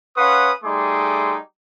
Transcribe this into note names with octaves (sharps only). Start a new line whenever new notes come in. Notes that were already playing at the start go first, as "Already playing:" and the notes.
C#4 B4 F5 F#5 C6 D#6
G3 A3 D#4 G#4 C6 D6